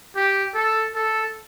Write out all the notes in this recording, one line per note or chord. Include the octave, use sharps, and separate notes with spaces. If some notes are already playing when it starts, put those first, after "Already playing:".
G4
A4
A4